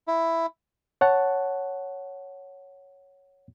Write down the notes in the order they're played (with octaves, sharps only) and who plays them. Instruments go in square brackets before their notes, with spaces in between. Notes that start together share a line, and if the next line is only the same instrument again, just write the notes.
[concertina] E4
[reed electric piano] C#5 F#5 A5